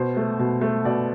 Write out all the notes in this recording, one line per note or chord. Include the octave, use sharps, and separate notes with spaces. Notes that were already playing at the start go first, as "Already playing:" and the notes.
Already playing: B2 C5
A3
B2
A3
B2 D5